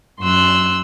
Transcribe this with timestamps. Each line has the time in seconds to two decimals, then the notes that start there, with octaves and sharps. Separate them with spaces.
0.20 F#2 C6 E6 F#6